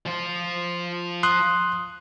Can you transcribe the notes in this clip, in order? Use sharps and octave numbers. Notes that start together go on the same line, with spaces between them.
F3 F4
C6 D#6 F#6